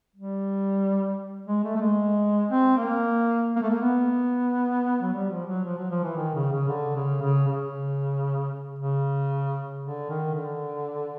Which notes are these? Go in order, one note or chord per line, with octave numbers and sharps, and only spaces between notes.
G3
G#3
A3
A3
G#3
C4
A#3
A#3
A3
A#3
B3
F#3
G3
F3
F#3
F3
F#3
F3
E3
D#3
C#3
C#3
D3
C#3
C#3
C#3
C#3
D3
D#3
D3